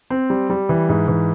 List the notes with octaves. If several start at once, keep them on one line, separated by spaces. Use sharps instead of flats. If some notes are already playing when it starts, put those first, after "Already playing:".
C4
G3
G3
E3
G#2
E3